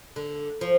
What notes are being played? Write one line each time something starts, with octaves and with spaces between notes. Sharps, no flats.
D3
F3